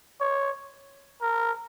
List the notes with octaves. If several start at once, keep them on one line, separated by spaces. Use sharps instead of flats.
C#5
A#4